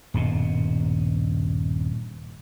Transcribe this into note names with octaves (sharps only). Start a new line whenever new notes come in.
D#1 G2 B2